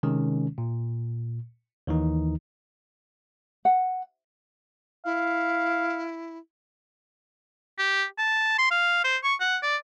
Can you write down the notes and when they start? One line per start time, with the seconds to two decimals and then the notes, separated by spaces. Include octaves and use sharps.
0.03 C3 D#3 G#3 C#4
0.58 A#2
1.87 D#2 D#3 E3 D#4
3.65 F#5
5.05 E4 F5
7.78 G4
8.18 A5
8.58 C6
8.71 F5
9.04 C5
9.23 C#6
9.40 F#5
9.63 D5